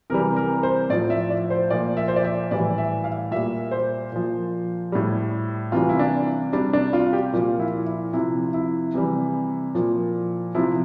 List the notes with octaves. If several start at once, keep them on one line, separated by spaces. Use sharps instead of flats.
C3 E3 G3 A#4
A#4
C5
A2 F3 D5
E5
D5
C5
A#2 F3 D5
E5
C5
D5
E5
A2 E3 G3 D5
E5
F5
A#2 G3 E5
C5
A#2 F3
A2 G3
C3 E3 G3 F4
E4
D4
C3 G3 D4
D4
F4
G4
A#2 F3 F4
E4
E4
C3 F3 E4
E4
C3 E3 G3
A#2 F3
C3 F3 E4